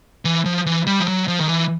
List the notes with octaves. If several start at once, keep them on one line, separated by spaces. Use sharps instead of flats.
E3
F3
E3
G3
F3
F#3
F3
D#3
E3